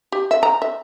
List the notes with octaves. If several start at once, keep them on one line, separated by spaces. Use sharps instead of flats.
G4
E5
A#5
E5